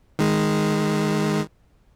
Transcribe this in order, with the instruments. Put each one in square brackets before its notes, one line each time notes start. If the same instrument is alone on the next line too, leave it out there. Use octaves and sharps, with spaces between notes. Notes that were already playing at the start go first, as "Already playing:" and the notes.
[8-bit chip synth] D#3 G#3